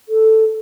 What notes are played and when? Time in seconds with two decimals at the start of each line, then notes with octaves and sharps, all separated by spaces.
0.09 A4